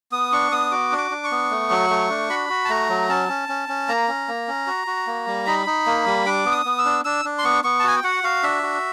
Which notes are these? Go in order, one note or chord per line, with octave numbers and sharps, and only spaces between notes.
B3 D#6
D4 C#6
B3 D#6
F#4 D6
D4
D6
D4
C#6
B3
A3
F#3
A3
D4
F#4 B5
F#4
A5
A3 A#5
F#3
C#4 A5
C#4
C#4
C#4
A#3 A#5
C#4
A#3
C#4
F#4
F#4
A#3
G3
D#4 B5
D#4
A#3
G3
D4 D6
B3
D#6
B3
E6
D4
D4 E6
D4
C6
B3 C#6
B3 C#6
A5
F#4 G#5
G5
F#4 F#5
F#4 F5
D4 E5
F#4